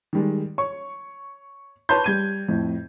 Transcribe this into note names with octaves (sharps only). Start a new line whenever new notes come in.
D#3 G3 G#3
C#5 C#6
B4 C#5 A5 B5 C6 G6
G3 G#6 D#7
F2 A2